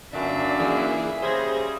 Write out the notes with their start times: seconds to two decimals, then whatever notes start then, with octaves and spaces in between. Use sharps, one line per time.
0.13 G1 F#2 A#2 D4 E5
0.59 E3 A#3 G#4
1.22 C#3 G3 G#4 C5 G#6 A#6